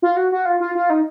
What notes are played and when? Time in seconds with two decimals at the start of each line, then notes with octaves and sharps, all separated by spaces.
0.02 F4
0.17 F#4
0.32 F#4
0.45 F4
0.60 F4
0.75 F4
0.90 D#4